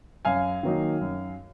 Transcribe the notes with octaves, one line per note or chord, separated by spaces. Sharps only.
F#2 F5 G#5
D#3 F#3 A#3 D#4
F#2